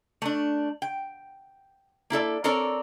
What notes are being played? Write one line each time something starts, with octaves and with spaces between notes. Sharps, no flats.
A3 D4
G5
A#3 E4 A4 D5
C4 A4 A#4 C#5 D5